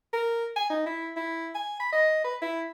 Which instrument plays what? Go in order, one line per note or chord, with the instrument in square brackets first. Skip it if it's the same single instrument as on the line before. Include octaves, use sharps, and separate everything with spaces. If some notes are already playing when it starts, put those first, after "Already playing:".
[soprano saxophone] A#4
G#5
D#4
E4
E4
G#5
B5
D#5
B4
E4